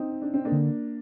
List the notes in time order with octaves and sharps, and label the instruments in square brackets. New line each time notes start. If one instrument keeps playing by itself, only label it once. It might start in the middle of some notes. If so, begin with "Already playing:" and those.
Already playing: [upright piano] C4 D#4
D4
C4
A#3 D4
[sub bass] D3